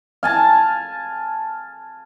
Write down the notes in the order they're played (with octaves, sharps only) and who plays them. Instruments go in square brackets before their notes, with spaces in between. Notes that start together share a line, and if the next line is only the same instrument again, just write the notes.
[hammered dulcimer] F5 G#5 A5